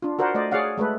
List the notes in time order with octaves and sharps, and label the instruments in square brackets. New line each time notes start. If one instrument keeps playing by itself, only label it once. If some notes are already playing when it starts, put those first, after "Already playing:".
[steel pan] D4 F4
F#4 A#4 C5 D5 F#5
A3 C5 D5 D#5
G#4 C#5 D5 F5 F#5
G#3 A3 A4 B4